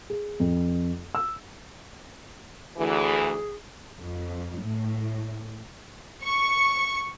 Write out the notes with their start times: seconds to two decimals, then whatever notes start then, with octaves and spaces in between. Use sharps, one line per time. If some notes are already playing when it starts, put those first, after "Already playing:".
0.10 G#4
0.40 F2
1.15 E6
2.78 D2 E3 G#4
3.99 F2
4.62 A2
6.22 C#6